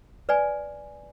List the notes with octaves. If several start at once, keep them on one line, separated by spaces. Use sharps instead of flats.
B4 D5 G#5